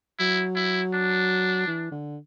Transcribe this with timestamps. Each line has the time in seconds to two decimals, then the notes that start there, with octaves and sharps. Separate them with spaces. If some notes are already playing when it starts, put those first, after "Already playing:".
0.19 F#3 E4
0.56 E4
0.94 D4
1.67 E3
1.91 D3